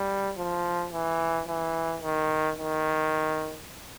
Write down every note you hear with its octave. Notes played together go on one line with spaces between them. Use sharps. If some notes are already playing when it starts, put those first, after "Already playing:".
Already playing: G3
F3
E3
E3
D#3
D#3